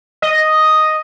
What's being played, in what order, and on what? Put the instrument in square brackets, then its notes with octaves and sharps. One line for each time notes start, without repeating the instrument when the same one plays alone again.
[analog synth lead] D#5